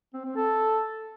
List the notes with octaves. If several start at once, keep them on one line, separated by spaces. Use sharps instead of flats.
C4
C4
A4